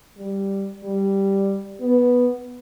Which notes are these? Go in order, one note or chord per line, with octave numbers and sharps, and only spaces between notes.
G3
G3
B3